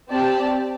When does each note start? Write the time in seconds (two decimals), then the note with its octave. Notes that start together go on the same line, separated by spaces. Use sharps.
0.09 C4 G4 D5 A5